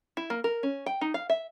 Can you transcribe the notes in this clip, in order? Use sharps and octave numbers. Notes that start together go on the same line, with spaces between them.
E4
A#3
A#4
C#4
G5
D#4
F5
E5